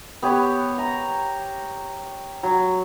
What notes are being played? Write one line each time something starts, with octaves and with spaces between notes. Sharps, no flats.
B3 G4 C#5
A#5
F#3